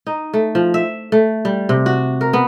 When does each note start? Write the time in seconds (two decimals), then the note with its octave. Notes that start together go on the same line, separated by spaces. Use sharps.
0.07 D#4
0.34 A3
0.55 F3
0.74 E5
1.12 A3
1.45 G3
1.69 C3
1.86 F#4
2.21 A#4
2.33 B3